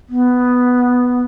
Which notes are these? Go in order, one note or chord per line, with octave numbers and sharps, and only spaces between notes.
B3